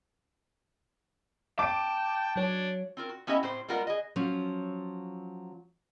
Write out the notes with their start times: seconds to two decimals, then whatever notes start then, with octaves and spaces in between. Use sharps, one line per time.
1.59 G5 A5 D6 D7
2.36 F#3 D4 C#5
2.97 C4 F4 A#4
3.09 F#4
3.27 B3 C#4 E4 G4 D#5 E5
3.43 A2 C4 C5
3.68 G3 G#3 B3 F4 A#4 F#5
3.87 G#4 D#5
4.16 F3 F#3 C#4